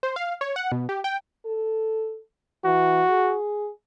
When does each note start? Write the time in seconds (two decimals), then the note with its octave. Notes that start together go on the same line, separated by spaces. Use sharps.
0.03 C5
0.16 F5
0.41 C#5
0.56 F#5
0.72 B2
0.89 G4
1.04 G5
1.46 A4
2.65 E3 F#4
3.09 G#4